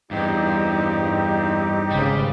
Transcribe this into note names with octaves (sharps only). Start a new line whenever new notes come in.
E2 G2 C4 D#4 G4
G#1 C#3 G3